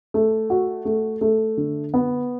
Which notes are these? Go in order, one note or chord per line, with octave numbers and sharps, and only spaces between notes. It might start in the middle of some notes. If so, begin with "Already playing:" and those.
A3
F#4
A3
A3
D3
B3